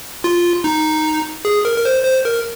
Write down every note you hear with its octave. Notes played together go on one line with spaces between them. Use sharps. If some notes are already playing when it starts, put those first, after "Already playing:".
F4
D#4
G#4
A#4
A#4
C5
C5
A#4